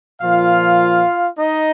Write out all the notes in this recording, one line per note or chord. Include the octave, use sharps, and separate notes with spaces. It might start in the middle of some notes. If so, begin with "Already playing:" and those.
A#2 F3 F4 F5
D#4 D#5